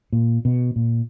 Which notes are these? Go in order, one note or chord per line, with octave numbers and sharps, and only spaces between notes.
A#2
B2
A#2